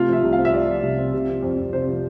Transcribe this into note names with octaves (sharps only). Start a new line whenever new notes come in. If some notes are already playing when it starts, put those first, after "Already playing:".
Already playing: C3 A3 F4
F3 E5
C2
F5
C4
E5
C3 D5
F3
C2
C4
C3
F3
F2
F2
C3 C5
F3